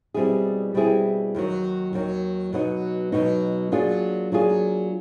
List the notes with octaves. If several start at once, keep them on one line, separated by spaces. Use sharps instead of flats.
B2 G3 C4 E4 G#4
B2 G3 C4 E4 G#4
D#2 D#3 F#3
D#2 D#3 F#3
B2 F#3 B3 D#4
B2 F#3 B3 D#4
F#3 A#3 D4 F4 G#4
F#3 A#3 D4 F4 G#4